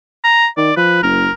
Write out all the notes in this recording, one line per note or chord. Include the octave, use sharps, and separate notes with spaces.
A#5
D#3 D5
F3 B4
F#1 A#4